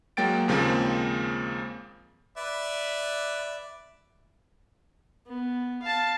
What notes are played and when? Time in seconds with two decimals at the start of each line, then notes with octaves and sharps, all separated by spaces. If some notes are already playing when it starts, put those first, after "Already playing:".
0.17 F#3 G#3 A#3 G5 A6 D7
0.48 D#2 C#3 F3 G#3 A#3 C4
2.37 B4 D5 E5
5.27 B3
5.82 F5 A5